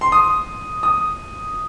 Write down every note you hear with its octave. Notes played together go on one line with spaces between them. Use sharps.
C6
D#6
D#6